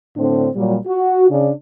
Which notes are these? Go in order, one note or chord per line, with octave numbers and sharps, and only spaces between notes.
A2 D3 C4 D4
A#2 F#3 G3
F#4
C#3 D4